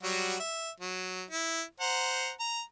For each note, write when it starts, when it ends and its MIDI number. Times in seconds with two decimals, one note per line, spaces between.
0.03 0.36 54
0.03 0.36 55
0.03 0.36 66
0.40 0.70 76
0.80 1.22 54
1.30 1.62 64
1.80 2.31 72
1.80 2.31 78
1.80 2.31 82
2.40 2.61 82